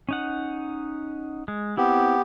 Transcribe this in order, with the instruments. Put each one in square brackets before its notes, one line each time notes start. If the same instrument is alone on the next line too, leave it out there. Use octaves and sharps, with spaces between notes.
[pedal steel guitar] C#4 D#4 F#5
G#3
[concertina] B3 G4 [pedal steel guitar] C4 E4